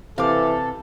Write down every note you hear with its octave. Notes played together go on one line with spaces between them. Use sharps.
C3 E3 A4 F5 D6